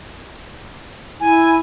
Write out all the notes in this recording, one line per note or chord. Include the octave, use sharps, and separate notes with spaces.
E4 G#5